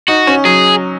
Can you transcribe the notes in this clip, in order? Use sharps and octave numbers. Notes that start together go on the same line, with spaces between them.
D#4 F#4
C#4
F#3 G#4